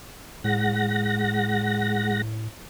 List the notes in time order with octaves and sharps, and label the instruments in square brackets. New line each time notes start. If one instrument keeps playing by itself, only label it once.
[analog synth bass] A2 [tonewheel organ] G#3 F#5 A#6